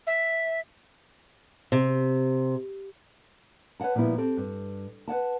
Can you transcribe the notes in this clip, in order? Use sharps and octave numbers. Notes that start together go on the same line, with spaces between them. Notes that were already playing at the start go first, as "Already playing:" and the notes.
E5
C3
B4 C#5 D#5 F#5 A5
A#2 F3 G3 B3 E4
C4 G4 A4
G2
B4 C#5 F#5 A5